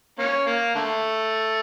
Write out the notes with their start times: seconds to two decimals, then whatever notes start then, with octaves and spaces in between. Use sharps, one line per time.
0.19 A#3 C#4
0.47 A#3
0.75 D3 A3